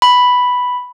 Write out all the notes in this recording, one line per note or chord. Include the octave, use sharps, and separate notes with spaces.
B5